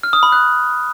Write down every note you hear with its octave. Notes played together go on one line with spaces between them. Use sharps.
F6
D#6
B5
F#6